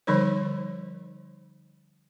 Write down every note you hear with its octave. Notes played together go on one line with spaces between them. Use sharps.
D3 F3 G3 D#4 C5 C#5